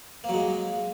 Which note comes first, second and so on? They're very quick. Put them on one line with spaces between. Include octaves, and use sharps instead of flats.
A#3 F#3 G#3